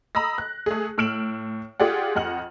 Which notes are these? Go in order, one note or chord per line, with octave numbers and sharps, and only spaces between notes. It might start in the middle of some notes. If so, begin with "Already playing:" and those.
D#5 A#5 B5 D#6 E6 A#6
F#6
A3 G#4
A2 E6 F6 D7 E7 F#7
F4 G4 G#4 D5 F#5
F2 D#5 F#5 F6 F#7